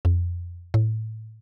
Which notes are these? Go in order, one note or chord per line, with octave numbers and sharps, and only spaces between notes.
F2
A2